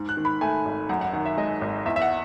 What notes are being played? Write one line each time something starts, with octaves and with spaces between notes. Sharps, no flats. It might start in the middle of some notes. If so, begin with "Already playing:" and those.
Already playing: G#2
F#6
D#3
B5
A3 G#5
G#1
F#2 F#5
F#5
D#3 F#5
E5
G#3 D#5
G#1
E2 E5
E5
F#5